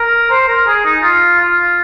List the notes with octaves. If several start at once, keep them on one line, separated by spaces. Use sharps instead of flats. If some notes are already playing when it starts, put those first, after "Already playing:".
Already playing: A#4
C5
A#4
G#4
D#4
F4
F4